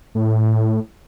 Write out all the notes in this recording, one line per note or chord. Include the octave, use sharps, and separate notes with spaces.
A2